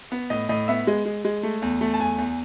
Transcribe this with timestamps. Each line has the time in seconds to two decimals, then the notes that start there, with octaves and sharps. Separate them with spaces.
0.12 B3
0.30 A2 D#5
0.49 A2 D#5
0.68 B3 E5
0.87 G#3
1.06 G#3
1.25 G#3
1.43 A3
1.62 E2
1.81 A3
1.94 A5
2.00 E2 G#5
2.18 E2